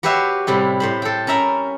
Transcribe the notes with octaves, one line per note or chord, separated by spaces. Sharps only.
F#4 G4 B4 C#5 E5 F5
A2 C3 G3 E4
A2 C5 B5
A4 G5
C#4 A#4 E5 A#5 B5